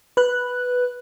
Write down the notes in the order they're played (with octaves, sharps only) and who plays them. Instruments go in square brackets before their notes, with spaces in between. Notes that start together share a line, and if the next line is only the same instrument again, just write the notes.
[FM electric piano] B4 F#6